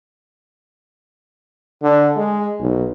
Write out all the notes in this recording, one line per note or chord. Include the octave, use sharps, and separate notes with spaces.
D3
G#3
B1